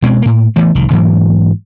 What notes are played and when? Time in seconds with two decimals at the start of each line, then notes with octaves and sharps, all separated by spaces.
0.02 B2 G#3 C4
0.22 A2 A#3
0.56 E3 A3 B3
0.75 F1 C2 D#3
0.91 G#2 E3 F#3 A#3